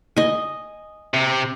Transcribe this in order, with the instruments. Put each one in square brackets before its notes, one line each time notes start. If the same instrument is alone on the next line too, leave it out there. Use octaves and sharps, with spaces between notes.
[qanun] D#5 G#5
[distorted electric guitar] C3